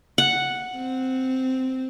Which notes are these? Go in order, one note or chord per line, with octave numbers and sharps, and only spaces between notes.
F#5
C4